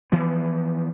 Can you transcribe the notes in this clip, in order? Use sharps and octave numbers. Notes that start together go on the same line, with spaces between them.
E3 F3 B3